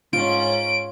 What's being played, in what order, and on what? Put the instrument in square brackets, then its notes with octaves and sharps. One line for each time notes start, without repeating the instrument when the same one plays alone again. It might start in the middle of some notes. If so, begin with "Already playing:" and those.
[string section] G#2 C#4 [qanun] F4 [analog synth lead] D7